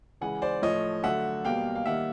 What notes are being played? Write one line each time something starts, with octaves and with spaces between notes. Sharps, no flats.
C#3 E3 G#3 F#5 G#5
C5 D5
A2 F3 A3 C#5 D#5
D3 F#3 A3 E5 F#5
B2 G3 A#3 F5 G5
F5
D#3 G3 A#3 E5 F#5